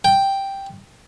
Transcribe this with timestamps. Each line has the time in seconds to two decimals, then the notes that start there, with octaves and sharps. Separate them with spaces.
0.05 G5